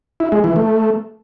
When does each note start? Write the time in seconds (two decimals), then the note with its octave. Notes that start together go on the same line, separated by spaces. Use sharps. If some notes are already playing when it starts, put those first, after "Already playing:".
0.20 E4
0.32 G#3
0.44 E3
0.56 A3